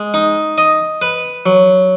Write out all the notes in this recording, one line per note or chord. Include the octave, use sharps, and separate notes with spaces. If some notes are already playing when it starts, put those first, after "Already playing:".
Already playing: G#3
D#4
D#5
B4
F#3